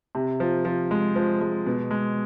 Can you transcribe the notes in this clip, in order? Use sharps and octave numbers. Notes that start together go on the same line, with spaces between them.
C3
F3
F3
G#3
F3
G#3
B2
G#3